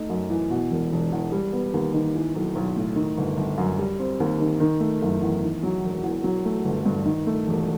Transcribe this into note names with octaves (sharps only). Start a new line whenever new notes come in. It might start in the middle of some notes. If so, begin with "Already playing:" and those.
Already playing: A3 D#4
F#2
E3
B2
E1
E1
E2
G3
B3
D#2
D#3
E3
B1
B1
A2
D#3
G1
G1
F#2
G3
C4
D#2
D#3
D#3
A3
F#1
E2
D#3
F#3
E1
E2
F#3
A3
G1
G2
D#3
A3
E1